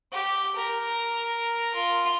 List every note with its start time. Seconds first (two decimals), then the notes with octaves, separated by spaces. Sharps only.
0.11 G4
0.56 A#4
1.74 F4